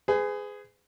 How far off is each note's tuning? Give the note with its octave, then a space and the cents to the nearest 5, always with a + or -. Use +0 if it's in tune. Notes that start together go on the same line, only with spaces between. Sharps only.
G#4 +0 B4 +40